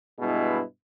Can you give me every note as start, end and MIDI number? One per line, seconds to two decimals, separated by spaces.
0.19 0.62 43
0.19 0.62 47
0.19 0.62 56
0.19 0.62 64